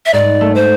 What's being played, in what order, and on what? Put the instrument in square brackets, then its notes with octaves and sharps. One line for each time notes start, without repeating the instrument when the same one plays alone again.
[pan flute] E5
[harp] G#2 [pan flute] D5
[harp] A3
[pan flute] C5